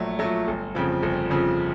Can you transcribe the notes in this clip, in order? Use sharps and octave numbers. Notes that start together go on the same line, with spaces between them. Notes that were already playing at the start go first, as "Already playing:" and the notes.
Already playing: A#1 A#2 F#3 A3
A#2 F#3 A3
G1
F2 C#3 F3
G1
F2 C#3 F3